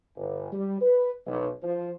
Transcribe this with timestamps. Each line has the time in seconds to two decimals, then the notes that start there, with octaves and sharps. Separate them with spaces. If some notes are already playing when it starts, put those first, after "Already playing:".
0.17 G1
0.52 G3
0.81 B4
1.27 B1
1.63 F3